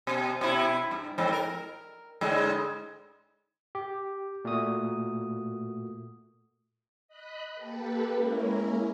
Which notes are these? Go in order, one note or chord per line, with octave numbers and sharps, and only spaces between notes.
B2
B2 E4
G2
F2 G#2
A#4
G#2 D3 G#3
G4
A#2 A3 F#4 D#6
D#5 B5 F#6
A#3 G4 A4 B4
G#3 A#3 C#4 E4 A#4